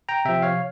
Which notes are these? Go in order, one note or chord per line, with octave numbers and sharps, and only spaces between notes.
G5 A#5
C3 F3 E5 G5
C#5 F5